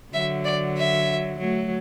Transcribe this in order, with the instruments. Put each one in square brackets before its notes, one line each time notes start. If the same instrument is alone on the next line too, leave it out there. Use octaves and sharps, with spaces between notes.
[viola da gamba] D3 F#3 [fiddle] E5
[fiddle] D5
E5
[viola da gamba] F#3 A3